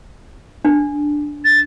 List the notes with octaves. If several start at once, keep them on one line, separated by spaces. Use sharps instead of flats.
D4
A6